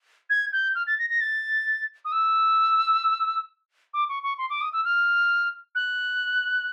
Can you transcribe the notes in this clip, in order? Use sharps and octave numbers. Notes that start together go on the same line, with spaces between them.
G#6
G6
F6
A6
A#6
A#6
A6
D#6
E6
D6
C#6
C#6
C6
D6
D#6
E6
F6
F#6